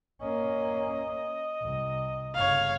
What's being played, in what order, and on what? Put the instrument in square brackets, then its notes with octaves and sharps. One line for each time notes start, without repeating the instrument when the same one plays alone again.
[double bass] A#3 C#4 [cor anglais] D#5
[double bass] C2
[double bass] G1 C#3 [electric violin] C#5 F5